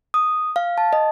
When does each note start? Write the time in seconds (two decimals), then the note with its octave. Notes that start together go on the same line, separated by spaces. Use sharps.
0.14 D#6
0.56 F5
0.78 A5
0.93 D#5